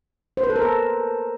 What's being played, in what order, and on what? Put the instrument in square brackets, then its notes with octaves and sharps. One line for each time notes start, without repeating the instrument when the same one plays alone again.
[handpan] C5
B4
A4
A#4
A4